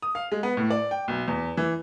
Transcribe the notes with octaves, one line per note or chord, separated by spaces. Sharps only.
D#6
F5
G#3
B3
A2
D5
G5
B1
E2
E3